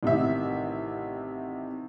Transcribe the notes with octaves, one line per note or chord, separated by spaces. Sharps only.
A1 C3 D#3 E5